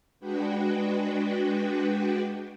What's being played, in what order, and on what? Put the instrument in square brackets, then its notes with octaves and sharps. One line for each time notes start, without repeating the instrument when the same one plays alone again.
[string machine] G#3 D4 F#4 B4 G5